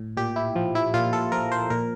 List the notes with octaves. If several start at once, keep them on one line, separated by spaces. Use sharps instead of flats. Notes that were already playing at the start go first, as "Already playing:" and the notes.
Already playing: A2
A#2 G4
E4
F3
E4
A#2 F4
A4
F3 A#4
C5
A#2 A#4